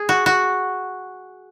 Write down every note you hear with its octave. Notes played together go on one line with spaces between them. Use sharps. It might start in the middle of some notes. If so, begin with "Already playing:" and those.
Already playing: G#4
F#4
F#4